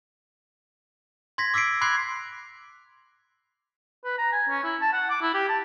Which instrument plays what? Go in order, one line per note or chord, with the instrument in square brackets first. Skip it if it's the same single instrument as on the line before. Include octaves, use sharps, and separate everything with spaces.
[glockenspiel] C6 G#6 A#6 B6
D6 E6 B6 C7 D7
B5 C6 D6 F#6 G#6 C7
[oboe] B4
A#5
G#5
C#4
E4
A5
F#5
D6
E4
G4
A5